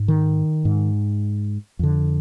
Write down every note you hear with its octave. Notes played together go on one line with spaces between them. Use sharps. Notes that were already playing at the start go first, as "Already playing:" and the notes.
Already playing: G#2
D#3
G#2
F2 D3